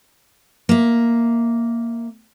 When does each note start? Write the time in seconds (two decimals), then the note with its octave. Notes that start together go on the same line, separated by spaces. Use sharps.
0.69 A#3 E5